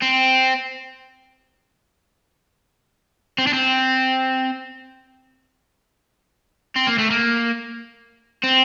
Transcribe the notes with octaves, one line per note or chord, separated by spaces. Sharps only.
C4
C4
D4
C4
C4
A#3
A3
A#3
C4